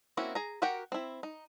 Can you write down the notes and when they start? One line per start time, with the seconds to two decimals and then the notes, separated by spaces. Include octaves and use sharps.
0.17 A#3 C4 C#4 E4 F#4
0.35 G#4 A#5
0.62 F#4 G4 A#4 F#5 G5
0.92 C4 E4
1.23 D#4